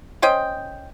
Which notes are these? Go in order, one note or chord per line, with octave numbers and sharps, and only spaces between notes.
C#4 C5 D#5 G5